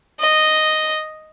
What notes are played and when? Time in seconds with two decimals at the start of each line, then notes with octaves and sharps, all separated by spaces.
0.20 D#5